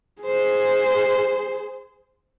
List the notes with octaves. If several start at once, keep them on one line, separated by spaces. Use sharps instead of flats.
G#4 C5